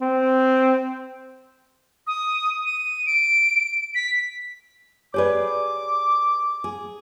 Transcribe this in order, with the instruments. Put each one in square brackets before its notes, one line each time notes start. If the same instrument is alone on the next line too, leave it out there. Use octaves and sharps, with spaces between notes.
[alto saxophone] C4
[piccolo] D#6
D#7
D7
B6
[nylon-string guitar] G4 G#4 B4 [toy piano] C#5 D5 [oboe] D6
[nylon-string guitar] G#4